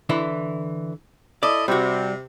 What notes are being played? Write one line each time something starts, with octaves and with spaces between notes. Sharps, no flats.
D3 E3 E4
E4 A4 D5 D#5
C3 G3 F#4